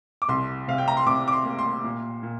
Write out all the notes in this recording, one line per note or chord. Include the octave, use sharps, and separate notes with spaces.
D6
C2 C6
C3 F5
G5
A#5
C6
C3 D6
D6
C6
A#3
C6
A#2
A#2